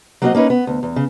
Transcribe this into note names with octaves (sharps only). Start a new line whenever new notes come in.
F#3 A#3 C4 F#4 D5 D#5
A#3 C#4 D#4 B4
B3
D2
E2
C#3